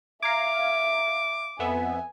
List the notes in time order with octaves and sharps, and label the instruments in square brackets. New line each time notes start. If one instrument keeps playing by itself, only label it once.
[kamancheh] E5 [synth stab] F5 A#5 G#6 [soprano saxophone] D6
[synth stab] F2 B3 E5 [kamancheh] G#5